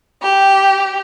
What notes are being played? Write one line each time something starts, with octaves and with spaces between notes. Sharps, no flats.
G4